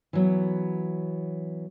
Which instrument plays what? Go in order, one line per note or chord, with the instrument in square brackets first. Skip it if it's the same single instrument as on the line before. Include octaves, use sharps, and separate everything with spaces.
[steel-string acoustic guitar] E3 F#3 B3